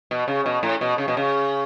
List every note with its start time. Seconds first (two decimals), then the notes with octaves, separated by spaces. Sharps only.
0.11 B2
0.28 C#3
0.46 B2
0.63 A2
0.81 B2
0.98 C#3
1.08 B2
1.17 C#3